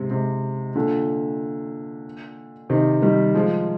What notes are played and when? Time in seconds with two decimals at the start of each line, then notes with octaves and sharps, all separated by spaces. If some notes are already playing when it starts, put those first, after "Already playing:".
Already playing: G#2 C3
0.10 G#2 C3
0.75 A#2 D3
2.70 C3 D#3
3.02 D#3 G3
3.35 F3 G#3